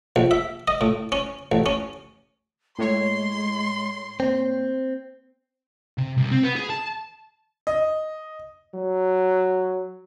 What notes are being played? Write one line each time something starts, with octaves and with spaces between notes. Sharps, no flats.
A#1
E5
D#5
A2
C#4
A1
C#4
A2 G#3 C#5 C6
A#3 C4
C3
C2
C4
B3
G#4
A5
D#5
F#3